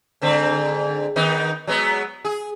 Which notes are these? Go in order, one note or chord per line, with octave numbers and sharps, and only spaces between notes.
G#2 D3 C4
D#3 B3 D#4
F#3 G#3 B3
G#4